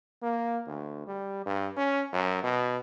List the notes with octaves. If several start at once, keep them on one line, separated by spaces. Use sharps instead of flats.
A#3
D2
G3
G2
C#4
F#2
B2